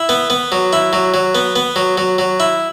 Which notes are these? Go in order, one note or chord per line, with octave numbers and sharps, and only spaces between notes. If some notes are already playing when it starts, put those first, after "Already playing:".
Already playing: E4
B3
B3
F#3
E4
F#3
F#3
B3
B3
F#3
F#3
F#3
E4